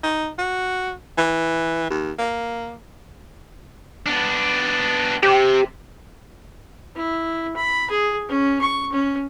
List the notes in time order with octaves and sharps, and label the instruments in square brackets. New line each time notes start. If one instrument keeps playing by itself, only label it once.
[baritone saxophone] D#4
F#4
E3
D#2
A#3
[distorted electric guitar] B3 D4
[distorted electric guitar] C3 [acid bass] G4
[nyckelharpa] E4
B5
G#4
C#4
C#6
C#4